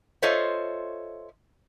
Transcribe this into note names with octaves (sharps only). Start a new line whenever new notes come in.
F4 A4 C5 C#5 D#5 E5